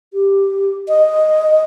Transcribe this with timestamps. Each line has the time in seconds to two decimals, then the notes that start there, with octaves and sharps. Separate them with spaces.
0.14 G4
0.88 D#5